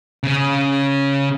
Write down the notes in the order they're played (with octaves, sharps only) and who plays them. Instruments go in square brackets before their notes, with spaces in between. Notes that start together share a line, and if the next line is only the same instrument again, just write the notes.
[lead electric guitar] C#3 C#4